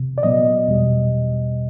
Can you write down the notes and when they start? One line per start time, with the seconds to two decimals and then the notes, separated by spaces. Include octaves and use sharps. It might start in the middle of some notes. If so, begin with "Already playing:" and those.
Already playing: C3
0.18 D5
0.23 A#2 F#3 B3 D#5
0.68 E2 B2 G3